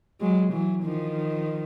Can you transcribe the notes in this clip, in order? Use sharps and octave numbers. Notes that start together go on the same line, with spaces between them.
F#3 G#3
E3 F#3
D#3 F3